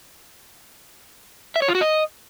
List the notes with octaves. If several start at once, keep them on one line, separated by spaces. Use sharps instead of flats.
E5
C#5
F4
F#4
D#5